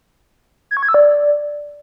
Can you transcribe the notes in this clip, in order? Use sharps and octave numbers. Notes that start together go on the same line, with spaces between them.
G#6
C#6
G#6
E6
D5